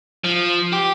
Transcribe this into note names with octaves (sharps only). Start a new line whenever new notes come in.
F3
G4